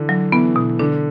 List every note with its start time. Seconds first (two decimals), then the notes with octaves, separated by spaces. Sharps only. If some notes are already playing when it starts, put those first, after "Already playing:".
Already playing: D3 E3
0.09 F#3
0.32 E3 B3
0.56 B2
0.79 D3 D4